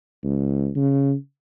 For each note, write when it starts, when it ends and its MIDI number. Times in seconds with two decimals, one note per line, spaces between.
0.23 0.69 37
0.76 1.14 49